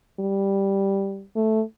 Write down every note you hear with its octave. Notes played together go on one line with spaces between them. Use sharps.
G3
A3